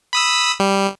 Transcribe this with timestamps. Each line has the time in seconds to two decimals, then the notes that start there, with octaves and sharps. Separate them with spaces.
0.13 B5 D#6 E6
0.60 G3